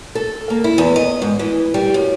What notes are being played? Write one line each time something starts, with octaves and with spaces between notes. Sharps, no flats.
A4
A#3
E4
E2
D#5
G#2
E3
G3
F#2